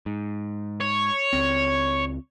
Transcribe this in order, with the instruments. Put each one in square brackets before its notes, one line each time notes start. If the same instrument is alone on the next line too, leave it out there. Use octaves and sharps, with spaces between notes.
[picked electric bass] G#2
[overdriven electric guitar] C#5
[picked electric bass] C#2 C4